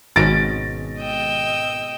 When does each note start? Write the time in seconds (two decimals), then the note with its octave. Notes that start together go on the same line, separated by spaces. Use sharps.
0.16 G#1 G#2 B2 C#4 A6 A#6 D7
0.99 D#5 G5 E6